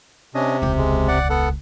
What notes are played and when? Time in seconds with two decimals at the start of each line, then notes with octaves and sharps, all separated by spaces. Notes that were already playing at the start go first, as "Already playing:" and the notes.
0.35 C3 C#4 D4 D#5
0.62 E1 C#2 G4
0.78 G#3
1.08 D5 F#5
1.30 B3 A4 F#5